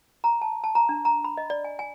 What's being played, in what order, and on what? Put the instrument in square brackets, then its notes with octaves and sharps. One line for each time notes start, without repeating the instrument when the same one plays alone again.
[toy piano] A#5
A5
A5
A#5
D4
A#5
B5
D#5
D5
G#5
G#5